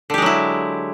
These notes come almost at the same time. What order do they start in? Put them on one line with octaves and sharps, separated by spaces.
D3 G4 G#3 F#3 E4